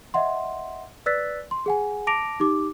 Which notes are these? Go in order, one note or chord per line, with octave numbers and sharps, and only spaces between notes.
D#5 E5 F#5 C6
B4 D5 E6 F#6 A6 B6
C6
G#4 F#5 G#5
A5 D6 A#6 D7 F7
D#4 G4 D6